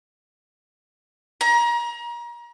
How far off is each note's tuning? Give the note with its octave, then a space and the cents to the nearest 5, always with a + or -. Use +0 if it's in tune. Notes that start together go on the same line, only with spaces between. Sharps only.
A#5 +30